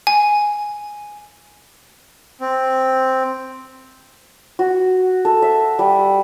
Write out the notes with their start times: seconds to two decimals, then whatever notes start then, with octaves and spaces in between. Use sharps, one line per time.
0.07 G#5
2.40 C4
4.59 F#4
5.25 A4
5.42 E5
5.79 G3